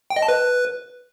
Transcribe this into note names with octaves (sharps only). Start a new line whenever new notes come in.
G5
D#5
A5
B4